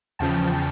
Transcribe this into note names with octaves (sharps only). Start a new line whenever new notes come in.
E2 C#3 F3 G5 A5